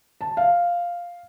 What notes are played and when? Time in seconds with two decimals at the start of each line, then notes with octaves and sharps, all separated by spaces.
0.21 A5
0.37 F5